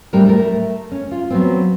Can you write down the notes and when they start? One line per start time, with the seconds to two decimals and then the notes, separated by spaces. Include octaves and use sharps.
0.13 A2 G3 C4 D4 A#4
0.26 A3 A4 A#4
0.92 C#4
1.11 F4
1.30 F#3 B3 C4